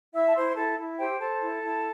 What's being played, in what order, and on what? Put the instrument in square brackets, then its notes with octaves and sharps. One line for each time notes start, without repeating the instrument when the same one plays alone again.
[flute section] E4 E5 E6
A5
E4 C5 C6
C6
E4 A4 A5
E4
G4 C5 G5
A4 C5 A5
E4
E4